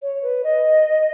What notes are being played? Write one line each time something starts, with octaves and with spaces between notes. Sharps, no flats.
C#5
B4
D#5